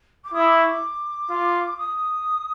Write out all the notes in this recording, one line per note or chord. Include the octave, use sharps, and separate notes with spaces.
D6
E4 D#6
D6
C#6
D6
F4
D#6